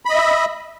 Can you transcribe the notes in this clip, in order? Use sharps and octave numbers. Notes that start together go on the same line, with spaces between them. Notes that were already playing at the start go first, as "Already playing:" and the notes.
D#5 E5 B5